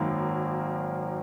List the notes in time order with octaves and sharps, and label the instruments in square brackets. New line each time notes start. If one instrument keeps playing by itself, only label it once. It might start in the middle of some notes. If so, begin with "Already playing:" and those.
Already playing: [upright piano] G#1 F#2 D#3 A#3